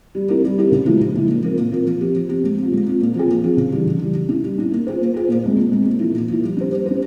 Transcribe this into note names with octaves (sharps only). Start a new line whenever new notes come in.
G3
C4 E4 G4 A#4
G3
C4 E4 G4 A#4
C#3
F3 G#3 E4
C#3
F3 G#3 E4
A#2
F3 C4 F4 A#4
A#2
F3 C4 F4 A#4
F3
C4 G4
F3
C4 G4
G#3
C4 F4
G#3
C4 F4
A#2
F3 C4 F4 G#4
A#2
F3 C4 F4 G#4
C#3
E3 G3
C#3
E3 G3
G3
C#4 E4
G3
C#4 E4
A#3
F4 G#4 C5
A#3
F4 G#4 C5
A#2
G#3 C4
A#2
G#3 C4
A#2
F3 A#3 E4
A#2
F3 A#3 E4
G3
C#4 G4 C5
G3
C#4 G4 C5